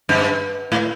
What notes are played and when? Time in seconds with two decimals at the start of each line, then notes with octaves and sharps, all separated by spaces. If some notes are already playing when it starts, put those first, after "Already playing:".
0.09 G2
0.72 A2